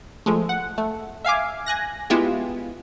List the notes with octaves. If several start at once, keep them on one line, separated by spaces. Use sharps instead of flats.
F3 G#3 A3
F#5
A3
E5 F5 G#5 D6
G#5 F#6 A#6
G#3 B3 E4 F4 G4 G#4